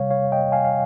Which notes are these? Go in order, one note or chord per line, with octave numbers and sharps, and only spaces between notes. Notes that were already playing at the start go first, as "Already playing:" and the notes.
Already playing: C3 G3 C#5 F5
C#5 F5
D#5 G5
F5 G#5
F5